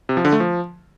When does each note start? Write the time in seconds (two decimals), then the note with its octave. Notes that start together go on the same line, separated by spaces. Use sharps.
0.09 C3
0.17 F3
0.25 D3
0.32 A3
0.40 F3